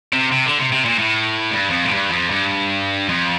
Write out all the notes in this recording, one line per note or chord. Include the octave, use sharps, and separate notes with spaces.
C3
C3
D3
C3
C3
A#2
A2
G2
F2
A2
G2
F2
G2
F2